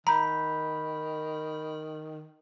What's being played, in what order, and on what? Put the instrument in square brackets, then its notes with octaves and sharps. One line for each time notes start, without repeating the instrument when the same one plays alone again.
[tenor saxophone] D#3 [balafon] A#5 [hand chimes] B5 G6